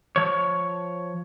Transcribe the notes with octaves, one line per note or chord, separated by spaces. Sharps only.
F3 C#5